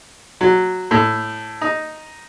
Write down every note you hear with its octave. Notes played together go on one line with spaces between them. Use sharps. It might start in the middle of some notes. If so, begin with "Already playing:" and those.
F#3
A2
D#4